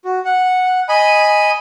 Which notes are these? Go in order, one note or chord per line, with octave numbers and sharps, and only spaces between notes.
F#4
F#5
D#5 G#5 B5